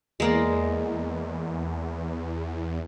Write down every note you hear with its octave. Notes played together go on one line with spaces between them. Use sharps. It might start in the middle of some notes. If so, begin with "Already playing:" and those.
E2 G#3 A#3 D5